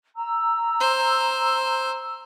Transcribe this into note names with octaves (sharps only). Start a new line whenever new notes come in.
A#5 E6
C5